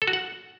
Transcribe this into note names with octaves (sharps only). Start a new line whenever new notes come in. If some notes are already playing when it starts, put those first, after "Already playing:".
A4
F#4
F#5